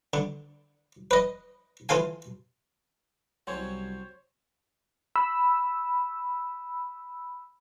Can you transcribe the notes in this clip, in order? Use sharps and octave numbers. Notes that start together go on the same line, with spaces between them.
D3
B4 D#5
E3 F4 A4 F5 G#5
C2 F#3 C4 C#4 C5 C#5
B5 E6